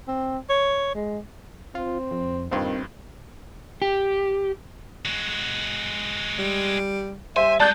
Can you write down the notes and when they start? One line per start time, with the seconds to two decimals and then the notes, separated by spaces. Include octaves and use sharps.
0.08 C4
0.49 C#5
0.95 G#3
1.75 C4 F4
2.11 F2
2.51 A#1 G2 D#3 C4
3.82 G4
5.05 G#3 F#4
6.39 G3
7.36 G3 C5 E5 G#5
7.60 G#3 D5 A5 F#6 G6